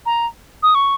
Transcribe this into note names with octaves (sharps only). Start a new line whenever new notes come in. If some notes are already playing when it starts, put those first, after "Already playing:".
A#5
D#6
C#6